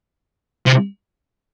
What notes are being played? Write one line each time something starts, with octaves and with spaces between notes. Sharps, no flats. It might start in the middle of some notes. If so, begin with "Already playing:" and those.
C3